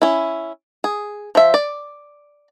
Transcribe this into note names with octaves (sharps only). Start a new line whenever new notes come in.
C#4 E4
G#4
F3 E5
D5